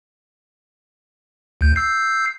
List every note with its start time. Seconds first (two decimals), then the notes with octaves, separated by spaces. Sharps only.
1.61 D2 G6
1.76 E6 G6 C7